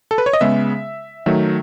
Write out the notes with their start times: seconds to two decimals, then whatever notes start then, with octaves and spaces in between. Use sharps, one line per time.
0.11 A4
0.18 B4
0.26 C#5
0.33 D#5
0.41 C#3 G#3 B3 E5
1.26 D#3 F#3 A3 E5